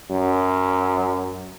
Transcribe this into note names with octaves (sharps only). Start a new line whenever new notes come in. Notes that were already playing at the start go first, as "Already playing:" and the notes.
F#2